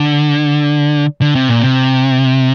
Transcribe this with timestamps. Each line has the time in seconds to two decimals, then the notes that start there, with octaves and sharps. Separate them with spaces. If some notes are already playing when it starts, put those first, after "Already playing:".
Already playing: D3
1.21 D3
1.35 C3
1.49 A#2
1.62 C3